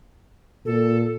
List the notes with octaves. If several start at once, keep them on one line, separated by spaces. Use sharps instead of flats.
A#2 A4